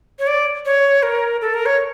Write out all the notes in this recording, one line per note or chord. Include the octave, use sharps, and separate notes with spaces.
C#5
D5
C#5
A#4
A4
A#4
C#5